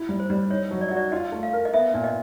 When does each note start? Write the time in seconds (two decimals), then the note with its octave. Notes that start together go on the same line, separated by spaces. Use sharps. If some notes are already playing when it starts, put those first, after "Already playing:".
Already playing: E4
0.09 G3
0.20 C5
0.30 G3
0.50 D#4 C#5
0.71 F#3
0.81 D5
0.89 D#5
0.91 F#4
0.96 D5
1.12 F4 D#5
1.32 A3
1.43 F5
1.53 A#4
1.65 D#5
1.73 B3 E5
1.94 A#2
2.04 D#5